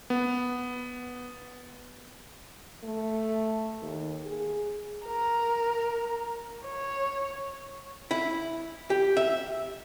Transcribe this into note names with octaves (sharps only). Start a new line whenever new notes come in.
B3
A3
D#2
G#4
A#4
C#5
E4
G4
E5